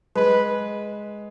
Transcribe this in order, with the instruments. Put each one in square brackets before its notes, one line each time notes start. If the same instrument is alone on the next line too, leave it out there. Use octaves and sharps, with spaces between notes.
[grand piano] G#3 [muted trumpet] B4